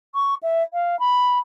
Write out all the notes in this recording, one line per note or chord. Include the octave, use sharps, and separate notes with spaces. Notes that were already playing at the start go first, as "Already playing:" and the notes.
C#6
E5
F5
B5